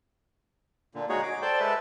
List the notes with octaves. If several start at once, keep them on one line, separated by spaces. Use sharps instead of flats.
A#2 D3
G#3 D#4 F#4 G#4 C#5
D6
A4 C5 D5 G5
G#3 A4 B4 E5